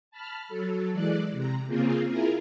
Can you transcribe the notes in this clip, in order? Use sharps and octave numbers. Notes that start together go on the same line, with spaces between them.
A5 B5 F6
F#3 A4
E3 G#3 D5 F#6
C3 A#5
C#3 A#3 C4 F4 G#4
E4 F4 G#4 A#4